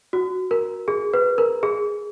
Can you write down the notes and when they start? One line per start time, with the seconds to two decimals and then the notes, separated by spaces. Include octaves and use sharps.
0.13 F#4
0.51 A#4
0.88 G#4
1.14 B4
1.38 A#4
1.63 G#4